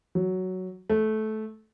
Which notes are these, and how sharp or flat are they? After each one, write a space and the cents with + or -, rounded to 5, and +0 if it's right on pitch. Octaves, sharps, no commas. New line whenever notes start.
F#3 +5
A3 -15